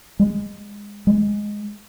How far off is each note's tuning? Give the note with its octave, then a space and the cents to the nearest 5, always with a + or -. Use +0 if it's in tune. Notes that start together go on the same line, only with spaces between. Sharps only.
G#3 -20
G#3 -5